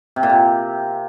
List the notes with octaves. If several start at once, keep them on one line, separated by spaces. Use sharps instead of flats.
C3
A#2
C3